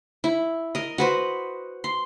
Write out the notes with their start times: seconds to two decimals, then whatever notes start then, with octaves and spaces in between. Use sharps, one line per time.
0.24 E4
0.75 A#4 D#5
0.98 F#4 B4 C5
1.84 C6